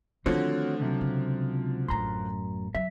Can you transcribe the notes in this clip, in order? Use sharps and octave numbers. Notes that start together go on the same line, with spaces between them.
D3 D#3 F3 A3 C4 F#4 C#5
C#2 C3 F#3
C#3
A1 F#2 A3 A#5 C6
F#3 E5